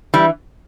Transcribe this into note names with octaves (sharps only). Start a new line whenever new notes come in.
E3 G3